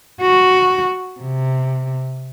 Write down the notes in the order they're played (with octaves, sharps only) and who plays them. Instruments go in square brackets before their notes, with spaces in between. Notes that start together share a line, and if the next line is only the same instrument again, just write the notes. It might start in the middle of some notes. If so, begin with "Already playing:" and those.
[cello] F#4
C3